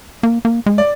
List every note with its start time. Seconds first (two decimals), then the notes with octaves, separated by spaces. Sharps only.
0.23 A#3
0.45 A#3
0.66 G#3
0.78 D5